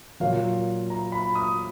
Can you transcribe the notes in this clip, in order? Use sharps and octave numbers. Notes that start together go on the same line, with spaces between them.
A#2 F#3 A#3 F5
A#5
B5
D#6